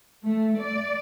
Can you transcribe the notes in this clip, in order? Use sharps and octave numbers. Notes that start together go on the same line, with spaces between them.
A3
D5